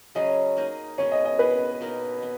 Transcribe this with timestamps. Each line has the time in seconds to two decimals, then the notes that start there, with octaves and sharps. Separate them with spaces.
0.15 C#3 F#3 C#4 G#4 D#5
0.57 A#3 D#4 G#4
0.98 B2 G#3 C#4 G#4 C#5
1.12 D#5
1.25 D#5
1.39 B3 E4 G#4 B4
1.81 B2 A#3 D#4 A#4
2.22 B3